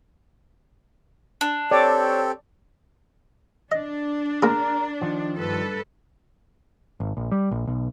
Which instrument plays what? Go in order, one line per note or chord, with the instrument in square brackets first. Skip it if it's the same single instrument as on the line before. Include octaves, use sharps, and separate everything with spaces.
[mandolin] D4
[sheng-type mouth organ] C4 G4 A4 [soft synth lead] C#5 [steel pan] D5
[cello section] D4 [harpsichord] D#5
[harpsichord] A#3 G#4 [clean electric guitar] A#4
[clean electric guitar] D#3 F3
[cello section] G2 A4 B4
[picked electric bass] G#1
A#1
G3
A#1
B1